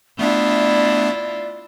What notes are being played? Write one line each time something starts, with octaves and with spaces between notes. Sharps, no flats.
A3 B3 D4 E4 F4 D5